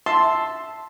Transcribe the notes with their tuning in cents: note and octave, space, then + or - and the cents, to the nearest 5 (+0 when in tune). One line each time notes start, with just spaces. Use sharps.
E5 -5 A5 +0 C6 +0